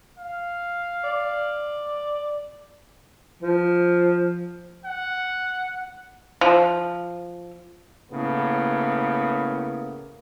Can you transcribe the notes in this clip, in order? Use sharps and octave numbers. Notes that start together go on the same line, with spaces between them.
F5
D5
F3
F#5
F3
A2 C#3 A#3 B3